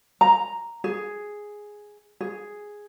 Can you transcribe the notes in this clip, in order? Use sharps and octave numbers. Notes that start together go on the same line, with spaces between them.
A#5
G#4
G#4